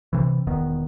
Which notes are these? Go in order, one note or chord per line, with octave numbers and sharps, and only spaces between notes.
C3 E3
E1 E2 D#3 B3